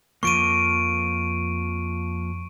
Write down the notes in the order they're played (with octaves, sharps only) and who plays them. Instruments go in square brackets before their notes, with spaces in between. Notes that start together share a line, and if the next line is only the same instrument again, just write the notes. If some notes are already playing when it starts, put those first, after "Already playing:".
[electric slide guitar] F2 F3 A#3 [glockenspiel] C#6 D7 D#7